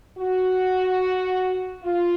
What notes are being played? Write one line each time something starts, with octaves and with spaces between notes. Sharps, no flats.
F#4
F4